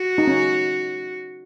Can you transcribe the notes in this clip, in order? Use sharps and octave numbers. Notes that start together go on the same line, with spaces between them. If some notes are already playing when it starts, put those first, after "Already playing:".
Already playing: F#4
D#4
C#4